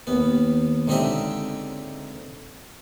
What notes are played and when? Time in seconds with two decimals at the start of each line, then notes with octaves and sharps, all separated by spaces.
0.07 D#2 B3
0.88 C#2 D3 C4 D#4 G4 E5